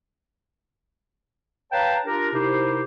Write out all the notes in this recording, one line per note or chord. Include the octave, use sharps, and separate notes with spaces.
B4 C#5 F5 G5 A5 A#5
D4 F4 G4 A#4
C3 D#4 E4 G4 A#4 C5